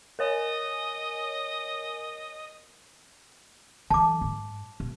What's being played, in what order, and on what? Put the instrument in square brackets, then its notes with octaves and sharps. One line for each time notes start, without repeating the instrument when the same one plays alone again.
[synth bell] A#4 C#5 G#5 [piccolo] D#5
[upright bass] D3 E3 [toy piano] A5 D6
[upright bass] G#2
B2